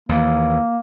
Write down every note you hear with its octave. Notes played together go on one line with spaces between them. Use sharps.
D#2 E3 A#3